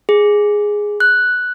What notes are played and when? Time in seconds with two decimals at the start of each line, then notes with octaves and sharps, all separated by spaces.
0.09 G#4
1.00 F#6